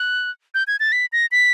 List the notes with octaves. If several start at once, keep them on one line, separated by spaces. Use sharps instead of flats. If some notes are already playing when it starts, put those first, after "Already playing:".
Already playing: F#6
G6
G#6
A6
B6
A#6
B6